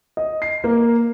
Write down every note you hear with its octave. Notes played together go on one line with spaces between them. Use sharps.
D#5
C7
A#3